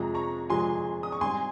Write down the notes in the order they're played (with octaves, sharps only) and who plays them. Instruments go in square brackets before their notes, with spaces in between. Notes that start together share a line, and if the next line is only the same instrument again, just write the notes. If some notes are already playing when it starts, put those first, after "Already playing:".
Already playing: [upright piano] F2 C3 F3 G#3 [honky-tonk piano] A#5
[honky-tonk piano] A#5 C#6
[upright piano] F2 C3 F3 G#3 [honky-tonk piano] G#5 C6
[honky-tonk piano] D#6
C#6
[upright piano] G#2 G3 C4 [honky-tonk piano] G#5 C6